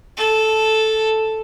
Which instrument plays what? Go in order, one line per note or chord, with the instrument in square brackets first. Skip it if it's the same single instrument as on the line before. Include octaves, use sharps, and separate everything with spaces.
[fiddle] A4